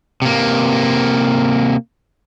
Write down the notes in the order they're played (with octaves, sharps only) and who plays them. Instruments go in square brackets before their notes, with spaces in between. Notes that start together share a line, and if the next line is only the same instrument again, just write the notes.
[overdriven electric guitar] C3 A#3